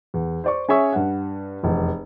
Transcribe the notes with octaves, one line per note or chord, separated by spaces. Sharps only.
E2
C5 D5 C#6
C#4 G#4 C#5 E5 C#6
G2 F#5
F1 E2